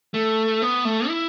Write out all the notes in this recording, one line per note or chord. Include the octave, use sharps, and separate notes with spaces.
A3
B3
A3
E4